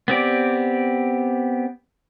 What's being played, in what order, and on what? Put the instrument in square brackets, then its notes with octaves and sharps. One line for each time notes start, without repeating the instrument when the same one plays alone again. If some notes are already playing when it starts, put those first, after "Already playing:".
[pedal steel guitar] B3 C4 G4 D5